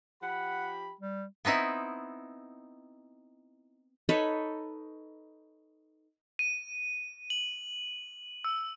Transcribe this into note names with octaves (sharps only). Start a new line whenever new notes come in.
F3 G4 F#5 B5
G3
B3 C4 D#4 E4
D#4 A4 B4 C#5
D#7
F#7
E6